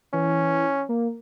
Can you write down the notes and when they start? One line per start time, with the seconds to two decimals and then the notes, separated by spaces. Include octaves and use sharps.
0.13 E3 C#4
0.89 A#3